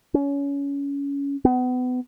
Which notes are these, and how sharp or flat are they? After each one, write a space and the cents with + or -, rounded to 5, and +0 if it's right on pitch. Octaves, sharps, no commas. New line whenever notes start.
C#4 +25
B3 +30